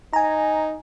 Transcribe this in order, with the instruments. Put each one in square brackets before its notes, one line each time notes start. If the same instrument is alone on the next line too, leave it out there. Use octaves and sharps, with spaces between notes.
[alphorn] D#4 [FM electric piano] G#5 A#5